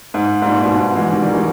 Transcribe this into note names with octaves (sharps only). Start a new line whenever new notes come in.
G#2
G#2
G2 A#2
G#2 B2
G#2 B2
E3 G#3
D#3 G3
D#3 G3
E3 G#3